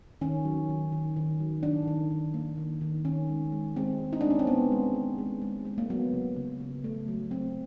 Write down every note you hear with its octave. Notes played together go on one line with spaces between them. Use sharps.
D#3 C#4
F#3
D#3
D#3
D#3
F#3
D#3 D4
D#3
D#3
A#3
D#3
D#3
D#3 C#4
G#3
G#3
G#3 C4
G#3
D#4
G#3 D4
C#4
C4
G#3 B3
G#3
G#3
G#3
G#3
G#3
A#3
F#3 B3
C#3
C#3
C#3
A3
F#3
F#3 C4